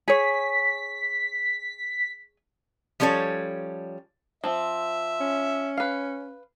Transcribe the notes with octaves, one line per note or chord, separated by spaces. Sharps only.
G#4 C#5 B6
F3 G3 C#4 A4 C#5
F3 C4 E5
C#4
B4 F5